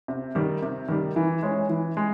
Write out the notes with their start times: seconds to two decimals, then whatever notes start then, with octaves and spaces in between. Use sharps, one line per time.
0.08 C3
0.35 D#3 G3
0.62 C3
0.89 D#3 G3
1.16 E3
1.43 G#3 C#4
1.69 E3
1.97 G#3